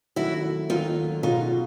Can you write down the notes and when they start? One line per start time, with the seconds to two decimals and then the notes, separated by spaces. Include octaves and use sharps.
0.16 D#2 D#3 F#3 A3 C#4 E4 F#4
0.70 D#2 D#3 F#3 A3 C#4 D#4 F4
1.23 B2 G#3 C#4 D#4 F4 F#4